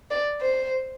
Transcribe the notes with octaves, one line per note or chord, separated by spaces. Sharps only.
D5
C5